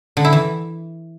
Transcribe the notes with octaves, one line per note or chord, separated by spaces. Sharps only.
D3
E4
E3